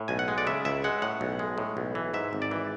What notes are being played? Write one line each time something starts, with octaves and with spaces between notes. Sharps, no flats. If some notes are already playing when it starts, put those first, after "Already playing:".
Already playing: A2
B1 G#5
F#5
G#3
D5
C#3 E5
C#2 E5
G#3 F#5
A2 F#5
B1
G#3
A2
B1
E3
G#2 E5
G#1
D5
E3